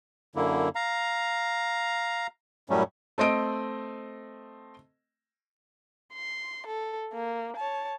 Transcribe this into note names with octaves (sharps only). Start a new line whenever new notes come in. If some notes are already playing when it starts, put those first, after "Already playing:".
F#2 D3 A#3 E4
F5 A#5
F#2 A2 F#3 G3 A3 C#4
A3 C4 D#5 D7
C6
A4
A#3
C#5 A5